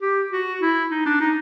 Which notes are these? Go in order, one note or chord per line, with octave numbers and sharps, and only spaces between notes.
G4
F#4
E4
D#4
D4
D#4